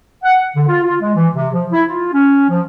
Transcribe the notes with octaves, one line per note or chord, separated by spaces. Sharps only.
F#5
D3
F4
F4
G#3
E3
C3
F3
E4
F4
C#4
F3